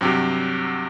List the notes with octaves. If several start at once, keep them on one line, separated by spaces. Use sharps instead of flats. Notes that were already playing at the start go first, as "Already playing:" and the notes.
G2 C3 F#3 G4